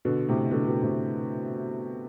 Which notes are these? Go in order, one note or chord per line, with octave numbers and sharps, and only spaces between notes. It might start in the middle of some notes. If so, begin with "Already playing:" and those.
B2 D3
A2 C3
B2 D3
B2
A2 C3